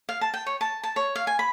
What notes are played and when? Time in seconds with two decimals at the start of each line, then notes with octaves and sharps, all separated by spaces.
0.09 F5
0.21 A5
0.34 G5
0.46 C#5
0.61 A5
0.83 A5
0.96 C#5
1.16 F5
1.27 G#5
1.39 B5